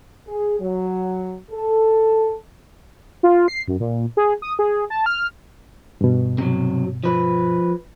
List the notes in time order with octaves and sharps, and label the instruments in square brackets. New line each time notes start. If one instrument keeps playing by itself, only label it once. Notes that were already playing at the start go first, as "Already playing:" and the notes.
[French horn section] G#4
F#3
A4
[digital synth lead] F4
C7
F#2
A#2
G#4
D#6
G#4
A5
F6
[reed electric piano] G2 B2
[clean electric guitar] C3 F#3
F3 B4